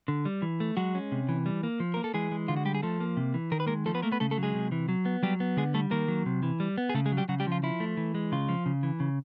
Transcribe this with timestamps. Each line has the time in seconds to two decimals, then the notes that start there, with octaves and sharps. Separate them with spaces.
0.08 D3
0.25 G3
0.42 E3
0.60 A3
0.77 F#3 G#3 F#4
0.95 C#4
1.12 C3
1.29 E3
1.46 G3
1.63 A#3
1.80 F3
1.94 A#3 A#4
2.04 A4
2.14 E3 G#3 G#4
2.32 G#3
2.48 D3 F4
2.57 F#4
2.65 G3 G4
2.75 G#4
2.83 F3 A3 A4
3.00 A#3
3.17 C3
3.34 E3
3.52 D#3 A#4
3.60 B4
3.66 G#3 A#3 A#4
3.86 F3 A3 A4
3.95 B3 B4
4.02 A3 A#3 A#4
4.12 B3 B4
4.20 C#3 A3 A4
4.31 A3 A4
4.38 F#3
4.43 G#3 G#4
4.55 C3
4.72 E3
4.89 F#3
5.06 B3
5.23 F#3 G3 G4
5.40 B3
5.57 D3 G#3 G#4
5.74 G3 A3 A4
5.91 D#3 A#3 A#4
6.08 F#3
6.26 C3
6.43 E3
6.60 G3
6.78 B3
6.90 G#4
6.95 C#3 A3 A4
7.06 G#3 G#4
7.12 F#3
7.17 G3 G4
7.29 C#3 F#3 F#4
7.40 G3 G4
7.47 F3 F4
7.63 F3 E4
7.80 A3
7.97 E3
8.15 G#3
8.32 C#3 F4
8.49 F3
8.66 C#3
8.83 E3
9.00 C#3